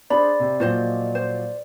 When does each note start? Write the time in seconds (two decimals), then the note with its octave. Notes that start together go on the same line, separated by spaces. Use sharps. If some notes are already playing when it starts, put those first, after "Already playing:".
0.10 D4 G#4 C5 D5 B5
0.40 C3
0.60 A#2 F3 F#3 F4 C5 D#5
1.15 C5